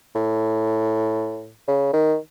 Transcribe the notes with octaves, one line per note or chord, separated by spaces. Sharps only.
A2
C#3
D#3